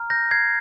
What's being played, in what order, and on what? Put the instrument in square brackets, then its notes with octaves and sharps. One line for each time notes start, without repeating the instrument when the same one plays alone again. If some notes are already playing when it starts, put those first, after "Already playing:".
Already playing: [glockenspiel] A#5 F6
G6 A#6
G#6 C7